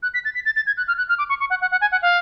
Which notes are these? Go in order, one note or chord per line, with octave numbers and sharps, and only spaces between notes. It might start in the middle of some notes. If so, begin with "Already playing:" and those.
F#6
B6
A6
B6
A6
A6
G#6
F#6
F6
F#6
F6
D6
C#6
C#6
F#5
F#5
F#5
G#5
F#5
F5